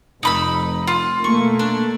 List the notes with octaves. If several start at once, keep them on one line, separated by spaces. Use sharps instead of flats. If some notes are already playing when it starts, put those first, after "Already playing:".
F1 D#4 B5 E6
F4
B2 A3 A#3 C#6
D4